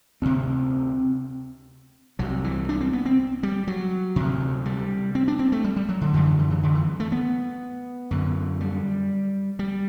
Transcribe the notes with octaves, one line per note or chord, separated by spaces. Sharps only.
D2 C3 C4
C2 C3 F#3
E3
D4
C4
B3
C4
G3
F#3
D2 C3
G3
C4
D4
C4
A3
G3
G3
F#3
D3
F#2 D3 E3
E3
E3
E3
D3
E3
A3
B3
F#2 D3
G3
G3